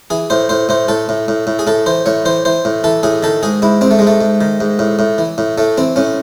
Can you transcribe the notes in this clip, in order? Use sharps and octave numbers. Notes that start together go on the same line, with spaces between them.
E3 G#4
A2 C5
A2 C5
A2 C5
A2 A4
A2
A2
A2
G#4
A2 A4
E3 C5
A2 C#5
E3 C5
E3 C5
A2
E3 A4
A2 G#4
D#3 A4
G#2 G#4
G#2 E4
G#2 C4
A3
G#2 G#3
A3
G#2
D#3
G#2
A2
A2
E3
A2
A2 A3
E3 C4
A2 C#4